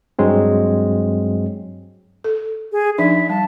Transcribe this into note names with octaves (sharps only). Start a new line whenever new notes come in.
G2 F#3 G#3 C4
A4
G#4
F3 D4 D#4 E5
G3 A5